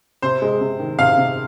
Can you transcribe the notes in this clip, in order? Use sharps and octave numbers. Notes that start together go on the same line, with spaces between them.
C3 C5
G#3
C3
D#3
C3 F5
C3